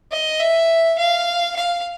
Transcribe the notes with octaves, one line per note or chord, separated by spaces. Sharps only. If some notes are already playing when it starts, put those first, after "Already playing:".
D#5
E5
F5
F5